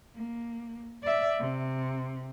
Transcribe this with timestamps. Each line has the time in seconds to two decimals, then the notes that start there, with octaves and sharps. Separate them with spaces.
0.16 A#3
1.02 D5 E5
1.40 C3